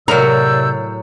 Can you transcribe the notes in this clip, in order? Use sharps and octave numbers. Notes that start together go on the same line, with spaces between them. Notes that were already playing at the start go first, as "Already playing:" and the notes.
A2 C3 F#3 A#4 D5 E6 G6